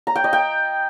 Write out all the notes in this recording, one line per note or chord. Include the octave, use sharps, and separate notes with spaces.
A#5
G5
D#5
G5